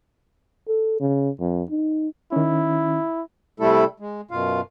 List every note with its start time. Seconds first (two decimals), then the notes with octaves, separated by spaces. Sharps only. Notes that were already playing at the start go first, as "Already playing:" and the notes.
0.68 A4
1.00 C#3
1.40 F2
1.71 D#4
2.32 D#3 C#4 E4
3.60 C3 G3 A3 E4 A4
4.00 G#3
4.31 F#2 B2 F4 F5